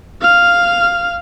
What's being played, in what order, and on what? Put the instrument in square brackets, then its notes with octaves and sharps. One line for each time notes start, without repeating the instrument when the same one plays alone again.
[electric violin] F5 F6